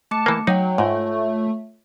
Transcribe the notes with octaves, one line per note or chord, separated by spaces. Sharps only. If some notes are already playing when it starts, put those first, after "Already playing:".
A3 A5 D6 C#7
E3 A#3
F#3 D#4 C#5 F#5 G5
G#2 A3 F4 C#5